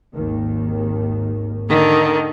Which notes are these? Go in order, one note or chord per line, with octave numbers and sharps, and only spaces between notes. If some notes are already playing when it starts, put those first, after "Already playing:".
G#1 D#2 D#3
D3 D#3